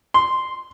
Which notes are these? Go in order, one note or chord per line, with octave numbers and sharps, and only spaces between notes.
C6